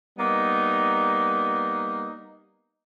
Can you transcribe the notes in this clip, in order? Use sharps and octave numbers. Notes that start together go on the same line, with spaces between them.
G3 A#3 B3 D#4